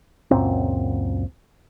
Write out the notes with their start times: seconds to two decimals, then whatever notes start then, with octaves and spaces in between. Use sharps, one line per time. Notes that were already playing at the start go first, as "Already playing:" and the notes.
0.31 C#2 F#2 A#2 C4